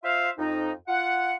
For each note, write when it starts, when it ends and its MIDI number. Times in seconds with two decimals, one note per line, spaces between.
0.03 0.29 65
0.03 0.29 72
0.03 0.29 76
0.03 0.29 77
0.38 0.71 41
0.38 0.71 63
0.88 1.34 65
0.88 1.34 78